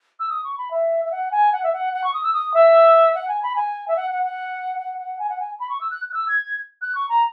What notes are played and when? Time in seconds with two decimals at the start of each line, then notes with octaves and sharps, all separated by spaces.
0.20 E6
0.30 D#6
0.44 C#6
0.58 B5
0.71 E5
1.05 E5
1.12 F#5
1.31 G#5
1.53 F#5
1.63 E5
1.73 F#5
1.94 F#5
2.04 C#6
2.14 D#6
2.23 E6
2.33 D#6
2.54 E5
3.15 F#5
3.28 G#5
3.43 B5
3.56 G#5
3.88 E5
3.96 F#5
4.11 F#5
4.23 F#5
4.79 F#5
4.98 F#5
5.19 G#5
5.29 F#5
5.40 G#5
5.60 B5
5.69 C#6
5.81 E6
5.90 F#6
6.10 F#6
6.14 E6
6.28 G#6
6.81 F#6
6.95 C#6
7.09 A#5